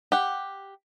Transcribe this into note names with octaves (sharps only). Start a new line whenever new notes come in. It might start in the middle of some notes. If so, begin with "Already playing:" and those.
G4 F#5